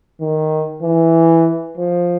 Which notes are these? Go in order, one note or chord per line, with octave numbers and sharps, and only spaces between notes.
D#3
E3
F3